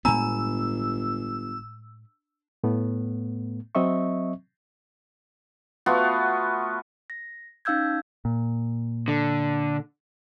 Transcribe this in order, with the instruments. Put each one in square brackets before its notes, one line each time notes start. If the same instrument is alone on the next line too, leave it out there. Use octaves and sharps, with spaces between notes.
[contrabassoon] G1 [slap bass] A2 G#3 B3 [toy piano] D4 A#5 B5 [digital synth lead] E6
[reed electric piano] A2 A3 B3
F#3 C4 D#5 E5 C#6
[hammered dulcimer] A3 B3 F4 F#4
[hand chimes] A#6
C#4 D#4 F5 E6 G6 G#6
[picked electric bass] A#2
[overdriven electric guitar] D3